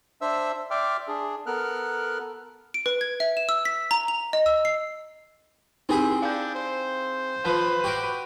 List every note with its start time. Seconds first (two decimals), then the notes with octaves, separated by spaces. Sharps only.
0.21 D4 C5 E5 E6
0.71 D5 E5 G5 C6 D6 F6
1.08 D4 G#4
1.46 B3 A4 A#4 F6 F#6
2.74 D7
2.86 B4
3.01 G#6
3.20 E5
3.37 E7
3.49 E6
3.65 B6
3.91 A#5
4.08 F7
4.33 D#5
4.46 E6
4.65 C7
5.89 C4 D#4 E4 G4 G#4 B5
6.22 D4 F5 G6
6.55 C5
7.45 F3 B4
7.84 F#4 G4 C#6 G6 D7